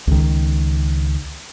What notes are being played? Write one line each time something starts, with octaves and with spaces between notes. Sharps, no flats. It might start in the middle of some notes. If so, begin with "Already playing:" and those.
C#2 D#3